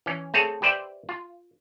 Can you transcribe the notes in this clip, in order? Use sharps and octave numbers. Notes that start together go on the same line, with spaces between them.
E3 C#4
A3 C4 G#4 A4 C#5
G4 B4 C5 D5 E5 G5
F4